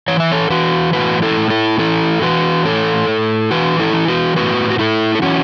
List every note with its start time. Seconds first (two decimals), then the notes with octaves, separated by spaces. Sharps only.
0.08 E3 C#5
0.20 E5
0.32 A4 C#5
0.50 E3 F#4 B4
0.93 A2 F#4 B4
1.22 E4 A4
1.37 A2
1.50 E4 A4
1.79 E3 E4 A4
2.22 E3 F#4 B4
2.65 A2 A4 C#5
3.08 A2
3.51 E3 F#4 B4
3.80 E4 A4
3.93 E3
4.08 F#4 B4
4.36 A2 F#4 B4
4.70 F#4
4.79 A2 E4 A4
5.15 A4
5.22 E3 C#4 F#4